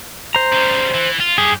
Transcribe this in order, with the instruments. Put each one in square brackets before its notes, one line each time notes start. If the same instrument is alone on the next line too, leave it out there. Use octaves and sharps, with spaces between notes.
[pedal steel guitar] C5 A#5
[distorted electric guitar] C#3 G3
E3
F4
[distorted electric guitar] G2 G4 [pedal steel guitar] G#4